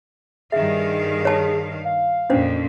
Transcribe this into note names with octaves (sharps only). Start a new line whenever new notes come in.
G2 D#3 G#4 E5 F5
C#5 A5
F5
F2 A#2 C#4 D4 C5